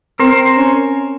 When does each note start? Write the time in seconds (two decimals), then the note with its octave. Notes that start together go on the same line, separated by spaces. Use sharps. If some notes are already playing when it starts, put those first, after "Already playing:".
0.19 C4 A#4 C5
0.57 C#4